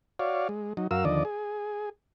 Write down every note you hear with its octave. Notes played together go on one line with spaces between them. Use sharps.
F#4 C#5 D5 F5
G#3
F#3 D#4
F#2 F#4 A#4 F5 E6
D#2 D3 F3 D5 D#5
G#4